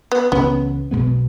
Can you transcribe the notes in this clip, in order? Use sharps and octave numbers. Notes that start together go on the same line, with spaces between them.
B3
C#2 C#3 E3 B3 C#4
B1 B2 G#3 B3